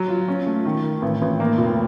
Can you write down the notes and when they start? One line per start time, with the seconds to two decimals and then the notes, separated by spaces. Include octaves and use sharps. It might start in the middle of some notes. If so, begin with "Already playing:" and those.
Already playing: F#3
0.08 F4
0.28 C#4
0.46 A3
0.66 D#3
0.84 D#3
1.02 A1
1.22 A1
1.40 A#3
1.58 F1